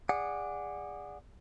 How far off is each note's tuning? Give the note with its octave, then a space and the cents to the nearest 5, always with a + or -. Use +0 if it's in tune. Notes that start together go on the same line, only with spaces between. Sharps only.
G#4 -25 D5 +0 F#5 -15